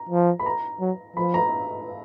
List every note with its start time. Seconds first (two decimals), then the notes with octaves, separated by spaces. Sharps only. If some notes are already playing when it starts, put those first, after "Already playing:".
Already playing: A#5
0.10 F3
0.39 B5
0.46 A#5
0.81 F#3
1.17 F3 B5
1.34 A#5